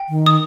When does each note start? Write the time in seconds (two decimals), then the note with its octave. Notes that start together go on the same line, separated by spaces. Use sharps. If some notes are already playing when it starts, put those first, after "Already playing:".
Already playing: G5
0.09 D#3
0.26 D#6